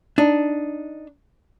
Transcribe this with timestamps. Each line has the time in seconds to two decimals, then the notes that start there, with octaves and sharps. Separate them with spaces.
0.18 D4 D#4